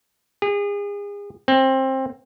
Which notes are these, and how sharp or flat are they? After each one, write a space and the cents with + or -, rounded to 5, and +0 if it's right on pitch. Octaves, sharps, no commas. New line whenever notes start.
G#4 -35
C4 +20